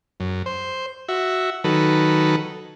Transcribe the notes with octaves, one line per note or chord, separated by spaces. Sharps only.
F#2
C5
F#4 E5
D#3 F#3 A4 B4